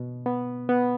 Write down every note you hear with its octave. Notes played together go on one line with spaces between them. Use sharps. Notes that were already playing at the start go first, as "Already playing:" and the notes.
Already playing: B2 B3
B3
B3